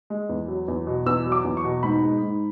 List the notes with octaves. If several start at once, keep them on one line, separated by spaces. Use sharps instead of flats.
G#3
E2
F#3
E2
B2
E2 E6
F#3
D6
E2
C#6
B2
G#2 B5
G#3
G#2